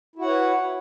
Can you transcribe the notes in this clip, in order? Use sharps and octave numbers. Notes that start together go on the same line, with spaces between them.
E4 F#4 B4 C#5 F#5